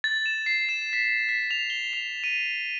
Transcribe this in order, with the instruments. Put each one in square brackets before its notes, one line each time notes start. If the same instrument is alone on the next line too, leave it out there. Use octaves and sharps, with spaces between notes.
[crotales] A6
E7
C7
E7
B6
B6
F7
G7
F7
D#7